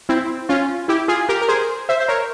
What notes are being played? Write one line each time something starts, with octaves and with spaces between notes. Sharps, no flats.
C4 E4
C#4 F4
E4 G4
F4 G#4
G4 A#4
A#4
G#4 C5
C5 E5
C5
A#4 C#5